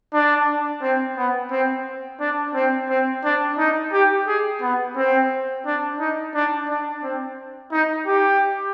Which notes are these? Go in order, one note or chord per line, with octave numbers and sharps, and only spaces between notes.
D4
C4
B3
C4
D4
C4
C4
D4
D#4
G4
G#4
B3
C4
D4
D#4
D4
D4
C4
D#4
G4